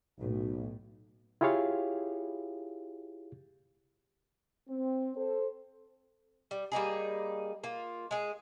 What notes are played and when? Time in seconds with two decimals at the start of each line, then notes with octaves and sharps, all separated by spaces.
0.18 B1 A2
1.41 E4 F4 G4 G#4 C#5 F5
4.69 C4
5.16 A4 C5
6.51 G3
6.72 G3 A#3 D#4 G#4
7.64 A#3 F4
8.11 G#3 G#4